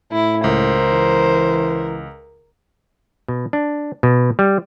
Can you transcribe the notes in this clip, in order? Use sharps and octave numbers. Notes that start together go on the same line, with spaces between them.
A2 E4
C#2 A#4 C5
E3
B2
D4
B2
G3